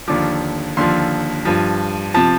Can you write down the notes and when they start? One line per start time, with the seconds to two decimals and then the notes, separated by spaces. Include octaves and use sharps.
0.08 D#2 D3 F3 D6
0.77 D#2 D3 F3 C6
1.45 G2 F3
2.14 C3 F3 A5